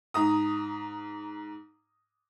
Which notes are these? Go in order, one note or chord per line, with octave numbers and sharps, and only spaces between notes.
G#2 A#5 D#6